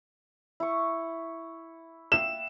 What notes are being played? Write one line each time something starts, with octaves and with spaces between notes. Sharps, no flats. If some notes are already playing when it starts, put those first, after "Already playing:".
E4 C#6
E5 F5 G5 E7